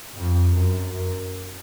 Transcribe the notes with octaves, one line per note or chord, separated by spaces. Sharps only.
F2
F#2